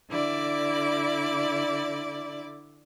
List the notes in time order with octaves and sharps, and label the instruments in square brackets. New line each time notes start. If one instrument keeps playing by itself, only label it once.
[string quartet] D3 E4 D5 D6